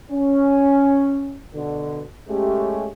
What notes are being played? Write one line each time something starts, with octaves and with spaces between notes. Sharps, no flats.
C#4
B2 D3
G#3 A3 C#4 G4